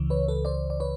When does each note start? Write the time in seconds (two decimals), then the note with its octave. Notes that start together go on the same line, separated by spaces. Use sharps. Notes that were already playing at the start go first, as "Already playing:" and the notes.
Already playing: C#2 C#3 E3
0.10 B4 C#5
0.28 A4 B4
0.45 C5 D5
0.70 D5
0.80 B4 C#5